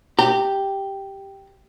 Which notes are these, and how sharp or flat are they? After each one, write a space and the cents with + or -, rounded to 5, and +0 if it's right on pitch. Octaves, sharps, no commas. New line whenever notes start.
G4 +0 A#5 -35